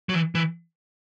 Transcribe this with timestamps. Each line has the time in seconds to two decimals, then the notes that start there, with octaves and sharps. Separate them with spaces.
0.09 F#3
0.14 E3
0.35 E3